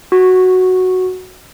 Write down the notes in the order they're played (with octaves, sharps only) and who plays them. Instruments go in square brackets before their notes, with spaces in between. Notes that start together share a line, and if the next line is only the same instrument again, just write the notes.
[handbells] F#4